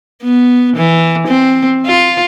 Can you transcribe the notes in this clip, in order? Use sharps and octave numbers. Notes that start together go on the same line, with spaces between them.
B3
E3
C4
F4